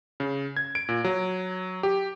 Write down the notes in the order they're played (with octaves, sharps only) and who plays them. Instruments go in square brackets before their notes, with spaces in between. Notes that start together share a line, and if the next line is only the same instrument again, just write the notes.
[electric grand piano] C#3
G#6
D7
A#2
F#3
G4